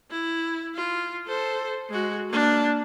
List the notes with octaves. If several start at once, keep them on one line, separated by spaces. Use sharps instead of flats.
E4
F4
A4 C5
G#3 F#4
A#3 D4